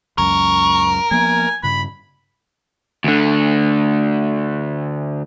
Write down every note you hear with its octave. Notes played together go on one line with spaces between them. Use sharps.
C#2 F#2 A#4 C#6
F3 A#3 B3 G#5
G2 C#3 B5
D2 D3